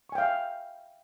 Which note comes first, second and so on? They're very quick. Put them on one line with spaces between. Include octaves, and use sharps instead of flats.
C#6 G#5 G5 F5 E5